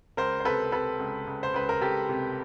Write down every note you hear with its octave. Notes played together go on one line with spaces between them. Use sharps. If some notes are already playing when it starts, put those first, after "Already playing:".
C#2 A#4 C5
C5
C3 A4 B4
C3 A4 B4
C#2
C#2
C5
C#2 B4
A#4
C#2 G4 A4
C3